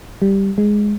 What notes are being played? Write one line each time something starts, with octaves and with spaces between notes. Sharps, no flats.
G3
G#3